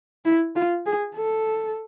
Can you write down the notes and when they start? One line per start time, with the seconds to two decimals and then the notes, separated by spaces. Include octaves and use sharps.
0.25 E4
0.56 F4
0.86 G#4
1.16 A4